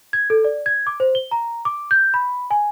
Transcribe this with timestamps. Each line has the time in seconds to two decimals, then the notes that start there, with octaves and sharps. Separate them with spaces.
0.13 G#6
0.30 A4
0.44 D5
0.66 G#6
0.87 D6
1.00 C5
1.15 G7
1.31 A#5
1.65 D6
1.91 G6
2.14 B5
2.51 G#5